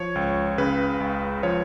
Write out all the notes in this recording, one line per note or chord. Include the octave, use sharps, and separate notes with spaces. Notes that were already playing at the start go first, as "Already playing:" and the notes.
Already playing: F3 C#5
C#2
C#3 B4
C#2
F3 C#5